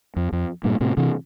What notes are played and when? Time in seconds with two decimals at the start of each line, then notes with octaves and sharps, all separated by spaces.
0.16 F2
0.32 F2
0.64 G2 A#2
0.80 A2 C3
0.97 C3 E3